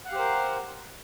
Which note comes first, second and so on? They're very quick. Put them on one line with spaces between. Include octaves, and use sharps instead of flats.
F#5 F5 G4 C5 A#4